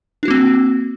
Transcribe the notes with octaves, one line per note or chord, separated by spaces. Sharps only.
A#3 C4 D4 F#4